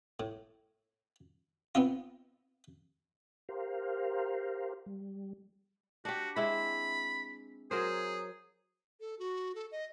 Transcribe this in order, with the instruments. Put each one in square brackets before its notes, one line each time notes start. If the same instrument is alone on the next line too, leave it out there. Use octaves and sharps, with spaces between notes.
[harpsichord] A2
B3 C4 D#4 F4
[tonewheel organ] G4 A#4 C5 F5
G3
[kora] D4 G4 [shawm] F#4
[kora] G#3 C4 E4 [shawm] B5
[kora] F#3 A#4 C5 [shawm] G#4
[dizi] A4
F#4
A4
D#5